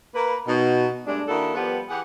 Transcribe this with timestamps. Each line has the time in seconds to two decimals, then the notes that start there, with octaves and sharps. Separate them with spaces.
0.15 A#3 B4
0.47 B2 D#4
1.06 G2 G#3 A3 D4
1.27 D#3 A#3 D4 E4 F#4 A4
1.55 F3 G3 B3
1.89 E3 G4 G#4 F#5